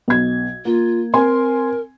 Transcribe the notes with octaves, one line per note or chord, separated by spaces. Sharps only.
B1 G#6
A#3 F4
C4 A#4 G#5 C6